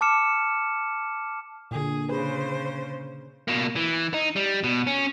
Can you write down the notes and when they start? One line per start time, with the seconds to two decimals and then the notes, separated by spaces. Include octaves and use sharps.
0.01 A5 D6 F6 C#7 E7
1.71 A#2 D3 G#4
2.09 C#3 G#4 B4 C5
3.48 B2 A#3
3.76 E3
4.14 D#4
4.36 G3
4.64 B2
4.87 C#4